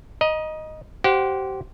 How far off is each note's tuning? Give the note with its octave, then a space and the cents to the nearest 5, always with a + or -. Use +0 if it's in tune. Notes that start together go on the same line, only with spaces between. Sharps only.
D#5 +0 A#5 +35
G4 -30 C5 +0 F#5 -20